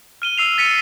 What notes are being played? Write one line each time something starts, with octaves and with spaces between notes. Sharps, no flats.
F6 D#7 G7
E6 C7 F7
A6 B6 C#7 D#7